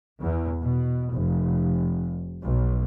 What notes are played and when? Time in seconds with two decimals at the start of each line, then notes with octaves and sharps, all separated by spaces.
0.20 E2
0.61 B2
1.11 F1
2.43 B1